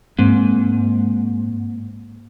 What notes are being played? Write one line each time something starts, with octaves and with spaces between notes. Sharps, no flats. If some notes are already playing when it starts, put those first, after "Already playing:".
G#2 A#3 C4